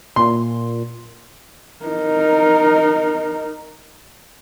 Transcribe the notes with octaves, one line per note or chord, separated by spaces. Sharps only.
A#2 C6
D#4 A#4